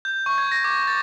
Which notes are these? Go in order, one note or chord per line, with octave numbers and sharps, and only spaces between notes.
G6
C#6
G#6
A#6
D6
A6